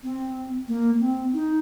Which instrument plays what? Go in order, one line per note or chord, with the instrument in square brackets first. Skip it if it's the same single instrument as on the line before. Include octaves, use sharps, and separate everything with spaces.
[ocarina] C4
A#3
C4
D#4